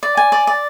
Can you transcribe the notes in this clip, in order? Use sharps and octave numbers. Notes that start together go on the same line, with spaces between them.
D5
G#5
D5
D5